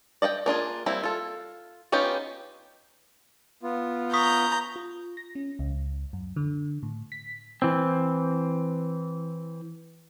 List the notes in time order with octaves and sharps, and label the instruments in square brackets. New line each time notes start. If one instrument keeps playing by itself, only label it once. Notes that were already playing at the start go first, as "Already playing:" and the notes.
[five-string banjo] D5 D#5 F5 G5
A#3 D4 F4 G#4
G3 A#3 C4 E4
F4 A4
B3 C#4 D#4 F4 G4
[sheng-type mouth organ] B3 F4
[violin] A#5 G6 [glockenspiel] C#6 D#6 B6
[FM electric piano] F4
A#6
C#4
C#2
F#2
D3
A2
B6
[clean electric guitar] E3 C4